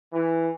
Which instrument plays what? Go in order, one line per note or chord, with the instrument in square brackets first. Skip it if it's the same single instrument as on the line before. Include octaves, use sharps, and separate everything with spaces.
[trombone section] E3